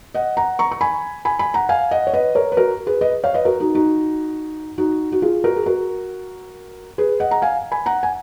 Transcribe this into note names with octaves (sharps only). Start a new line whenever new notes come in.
D#5 F#5
F#5 A#5
A#5 C#6
C#6
G#5 B5
G#5 B5
G#5 B5
F#5 A#5
F5 G#5
D#5 F#5
C#5
B4 D#5
A#4 C#5
B4
F#4 A#4
G#4 B4
B4 D#5
C#5 F5
B4 D#5
F#4 A#4
D#4 F#4
D#4 F#4
D#4 F#4
F#4
F4 G#4
F#4 A#4
G#4
F#4 A#4
G#4 B4
D#5 F#5
A#5
F5 G#5
G#5 B5
F#5 A#5
G#5